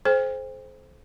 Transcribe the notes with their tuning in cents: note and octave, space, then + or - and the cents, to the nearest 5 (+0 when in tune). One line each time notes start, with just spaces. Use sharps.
A4 -45 C5 +0 G5 +45